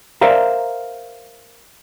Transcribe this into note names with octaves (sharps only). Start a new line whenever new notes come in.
A#4 C5 D5 E5 F5 A#5